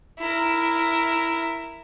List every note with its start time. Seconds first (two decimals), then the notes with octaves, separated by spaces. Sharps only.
0.19 E4 A#4